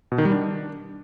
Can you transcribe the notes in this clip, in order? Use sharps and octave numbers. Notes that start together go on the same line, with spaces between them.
B2
D#3
G3
D4